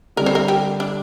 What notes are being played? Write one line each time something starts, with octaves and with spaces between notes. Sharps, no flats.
D3 G3 C4 A#4
C5
A#4
G4
D4